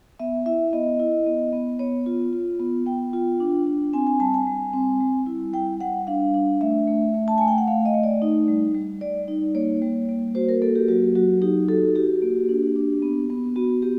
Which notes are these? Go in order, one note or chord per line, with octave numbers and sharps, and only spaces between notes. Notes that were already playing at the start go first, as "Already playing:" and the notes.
B3 E5
E4 E5
B3 D#5
E4
B3
B3
B3 C#5
F4
F4
B3
B3 G5
F4
D4
D4
C4 G#5
G#5
G3 A5
G#5
G3
C4
G3
E4
G3 G5
G3 F#5
D4 F5
D4
A3 E5
A3
A3
A5
A3 G#5
G5
F#5
A3 F5
D#5
A3
D5
D#4
G3
G3
G3 D5
D#4
A#3 C#5
G3
A#3
F#4 C5
A#4
A#3 A4
G4
F#3 F#4
F#3 F#4
D#4 G4
F#4 A4
F#4 G4
A#3
D4
D4
B3
B3
B3 F#4
B3 G4